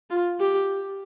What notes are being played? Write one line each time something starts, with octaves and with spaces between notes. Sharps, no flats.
F4
G4